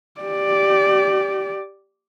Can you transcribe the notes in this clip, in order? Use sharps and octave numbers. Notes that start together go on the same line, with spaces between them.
G4 D5